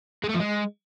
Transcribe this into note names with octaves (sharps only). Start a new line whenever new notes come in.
G#3
A3
F3
G#3